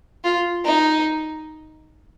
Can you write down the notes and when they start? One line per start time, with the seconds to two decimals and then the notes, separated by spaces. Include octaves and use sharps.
0.24 F4
0.65 D#4